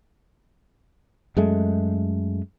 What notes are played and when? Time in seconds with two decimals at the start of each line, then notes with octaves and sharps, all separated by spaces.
1.37 F#2 G#3 A3